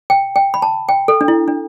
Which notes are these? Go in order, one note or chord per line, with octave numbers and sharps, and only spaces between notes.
G5
G5
B5
A5
G5
A4
D4
E4
D4